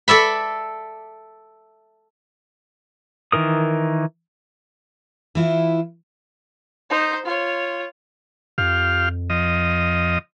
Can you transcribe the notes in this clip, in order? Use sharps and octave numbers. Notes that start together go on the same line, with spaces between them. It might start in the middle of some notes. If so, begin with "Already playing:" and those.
A4 D5 E5 B5
D#3 E3 A#4 D#6
E3 E4 F4
D#4 C5
F4 C#5
F2 F4 G4 F5
F3 D#5